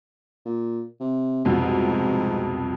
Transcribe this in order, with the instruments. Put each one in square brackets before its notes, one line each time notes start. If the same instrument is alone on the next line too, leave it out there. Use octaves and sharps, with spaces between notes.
[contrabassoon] A#2
C3
[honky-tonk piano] C2 F2 B2 [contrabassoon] G#2